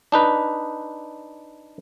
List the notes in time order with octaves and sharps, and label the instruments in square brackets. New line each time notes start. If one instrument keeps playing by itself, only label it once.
[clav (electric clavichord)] D4 D#4 B4